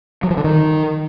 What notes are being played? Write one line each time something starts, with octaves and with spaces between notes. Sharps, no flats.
F#3
F3
D3
D#3